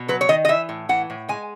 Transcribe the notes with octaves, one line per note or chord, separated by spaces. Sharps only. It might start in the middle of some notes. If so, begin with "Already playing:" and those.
Already playing: B2
F#3 B4
C#5
D#3 D#5
D#5
E3 E5
A2
E3 F#5
A2
G#3 G#5